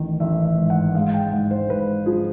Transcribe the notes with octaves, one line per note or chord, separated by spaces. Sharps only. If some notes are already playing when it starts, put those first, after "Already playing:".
Already playing: A1 D#3
A1 E5
E5
G#2
F#5
G#3 F5
G5
G#2 F#5
C5
G#2 B4
F3 G#4